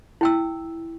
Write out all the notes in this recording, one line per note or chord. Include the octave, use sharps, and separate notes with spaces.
E4 G5 E6